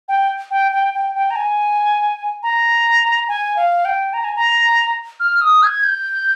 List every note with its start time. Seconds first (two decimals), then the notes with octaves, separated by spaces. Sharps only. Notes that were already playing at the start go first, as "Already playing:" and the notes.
0.08 G5
0.51 G5
0.72 G5
0.94 G5
1.15 G5
1.30 A#5
1.36 G#5
2.43 A#5
3.28 G#5
3.56 F5
3.85 G5
4.13 A#5
4.24 G#5
4.35 A#5
5.20 F6
5.41 D#6
5.63 G#6
5.84 G6